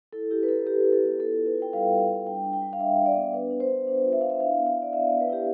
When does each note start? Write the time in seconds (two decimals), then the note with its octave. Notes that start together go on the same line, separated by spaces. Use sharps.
0.13 E4 A4
0.30 E4 G4
0.43 B4
0.48 E4 A4
0.66 E4 G4
0.85 E4
0.93 A4
1.02 B3
1.19 F4 A4
1.37 F4
1.46 B4
1.55 F4
1.62 G5
1.73 G3 F5
1.91 G3
1.99 F5
2.08 G3
2.26 D4 G5
2.44 D4
2.53 G5
2.62 G3
2.73 F5
2.79 D4 E5
2.97 D4
3.06 D5
3.16 B3
3.33 D4 B4
3.50 D4
3.60 C5
3.69 D4
3.87 D4
4.05 F4
4.13 E5
4.21 D4 F5
4.30 E5
4.40 E4 F5
4.57 B3
4.66 F5
4.76 E4
4.82 D5
4.93 B3 E5
5.07 D5
5.12 B3
5.20 B4
5.29 E4 G4